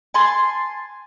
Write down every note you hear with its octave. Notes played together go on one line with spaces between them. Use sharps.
G#5 A5 C6